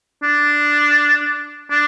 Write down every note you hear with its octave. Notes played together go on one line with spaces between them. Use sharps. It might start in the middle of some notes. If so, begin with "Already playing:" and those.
D4
D4